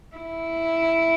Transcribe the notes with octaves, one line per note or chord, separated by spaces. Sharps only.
E4